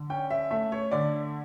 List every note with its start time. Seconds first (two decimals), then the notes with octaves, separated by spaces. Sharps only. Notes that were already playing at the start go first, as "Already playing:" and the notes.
Already playing: D3
0.10 C#4 G5
0.31 E5
0.51 A3 E5
0.72 C#5
0.91 D3 D5